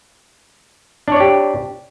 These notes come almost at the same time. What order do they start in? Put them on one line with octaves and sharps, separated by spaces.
D4 C#5 D5 G4